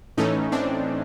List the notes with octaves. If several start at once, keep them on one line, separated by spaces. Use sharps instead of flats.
A2 E3 A3 C#4 D#4
C4 D4